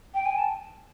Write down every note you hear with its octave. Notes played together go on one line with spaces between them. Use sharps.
G5
G#5
A5